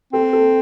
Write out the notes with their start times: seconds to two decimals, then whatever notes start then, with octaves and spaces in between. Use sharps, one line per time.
0.13 C4 A4
0.33 A4